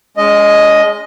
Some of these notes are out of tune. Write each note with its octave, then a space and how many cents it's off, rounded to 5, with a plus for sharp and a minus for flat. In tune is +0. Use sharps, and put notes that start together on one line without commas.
G#3 +0 C#4 +45 D#5 +0